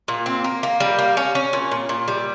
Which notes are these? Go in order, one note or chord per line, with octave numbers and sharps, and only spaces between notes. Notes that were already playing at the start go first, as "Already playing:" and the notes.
A#2
C4
A#3
A#3
G3
A#3
C#4
C#4
A#2
A#2
A#2
G3